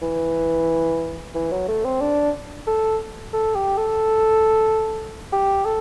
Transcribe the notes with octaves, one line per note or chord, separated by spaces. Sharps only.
E3
E3
F#3
A3
C4
D4
A4
A4
G4
A4
G4
A4